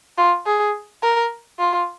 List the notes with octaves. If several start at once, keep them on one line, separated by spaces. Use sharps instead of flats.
F4
G#4
A#4
F4